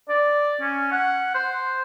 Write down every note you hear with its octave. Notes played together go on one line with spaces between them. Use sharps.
D5
C#4
F#5
C5